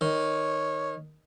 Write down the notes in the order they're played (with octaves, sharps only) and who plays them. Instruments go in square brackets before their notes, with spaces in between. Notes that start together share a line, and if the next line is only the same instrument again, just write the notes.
[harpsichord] D#3 [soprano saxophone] C#5